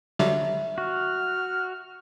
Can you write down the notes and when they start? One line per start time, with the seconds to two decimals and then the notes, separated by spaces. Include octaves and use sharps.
0.19 D3 F#3 G3 E5
0.78 F#4 F6